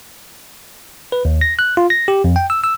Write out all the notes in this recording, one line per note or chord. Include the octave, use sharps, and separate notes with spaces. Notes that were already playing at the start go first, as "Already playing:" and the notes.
B4
D#2
A#6
F#6
F4
A#6
G4
F2
G5
E6
E6